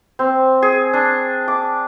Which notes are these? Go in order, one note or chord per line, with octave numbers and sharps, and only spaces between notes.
C4
G#4
D4
D6